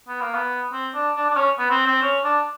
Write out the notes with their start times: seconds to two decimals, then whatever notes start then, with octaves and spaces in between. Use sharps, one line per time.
0.08 B3
0.21 A#3
0.34 B3
0.72 C4
0.95 D4
1.16 D4
1.30 D4
1.37 C#4
1.59 B3
1.70 C4
1.86 C4
2.02 C#4
2.24 D4